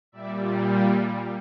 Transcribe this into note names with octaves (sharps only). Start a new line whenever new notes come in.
A#2 G3 D5 E5
F5 G5